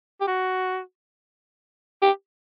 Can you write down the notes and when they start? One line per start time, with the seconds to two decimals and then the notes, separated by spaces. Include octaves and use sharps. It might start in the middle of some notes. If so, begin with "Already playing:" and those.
0.21 G4
0.28 F#4
2.02 G4